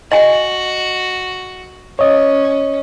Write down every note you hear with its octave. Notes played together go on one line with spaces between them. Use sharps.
F#4 D#5 G#5
C#4 C#5 D#5